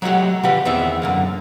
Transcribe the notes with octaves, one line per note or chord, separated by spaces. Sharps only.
F#3 G#3 A3 F#4 G4
D3 F3 G4 B4
E2 D#3 B3 C4 E5
F#2 D3 A#3